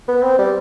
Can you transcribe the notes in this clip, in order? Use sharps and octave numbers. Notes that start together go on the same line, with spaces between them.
B3
C4
G3